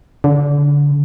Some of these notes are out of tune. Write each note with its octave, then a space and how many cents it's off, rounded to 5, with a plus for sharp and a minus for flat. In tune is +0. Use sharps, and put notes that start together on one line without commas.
D3 -25